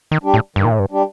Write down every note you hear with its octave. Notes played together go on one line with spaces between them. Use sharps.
D#3
G3 D4 G4
A2
G2 D#3
A#2
A2
G2
G3 D4 G4